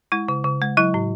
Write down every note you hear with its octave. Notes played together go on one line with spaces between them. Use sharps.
G#3 E4
C#3
C#3
G#3
F#3 E4
A2